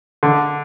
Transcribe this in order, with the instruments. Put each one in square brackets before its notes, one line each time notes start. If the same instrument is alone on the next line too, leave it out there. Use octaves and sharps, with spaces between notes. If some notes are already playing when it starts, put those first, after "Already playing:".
[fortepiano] D3